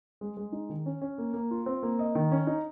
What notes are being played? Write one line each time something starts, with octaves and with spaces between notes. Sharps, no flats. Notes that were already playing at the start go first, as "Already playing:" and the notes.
G#3
G#3
D#4
D#3
C#4
C#4
A#3
A#3
F4
C4
A#3
D#5
D#3
C#4
D#4